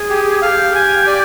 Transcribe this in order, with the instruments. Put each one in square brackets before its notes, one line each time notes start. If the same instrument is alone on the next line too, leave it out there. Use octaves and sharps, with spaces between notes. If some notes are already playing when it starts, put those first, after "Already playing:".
Already playing: [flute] G#4
[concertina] G4
[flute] A4 [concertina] F5
[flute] G4
[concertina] G#5
D5